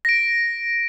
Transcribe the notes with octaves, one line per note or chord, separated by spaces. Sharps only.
A#6 D7